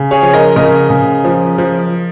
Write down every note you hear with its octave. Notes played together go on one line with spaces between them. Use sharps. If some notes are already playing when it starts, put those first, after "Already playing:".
Already playing: C#3
G#4 C#5
F3
A#4 D#5
C#3 A#4 D#5
C#3
F3
F3